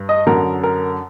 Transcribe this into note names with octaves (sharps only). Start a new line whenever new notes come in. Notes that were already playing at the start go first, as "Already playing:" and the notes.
Already playing: G2
D#5
F#2 D3 A#4
A#4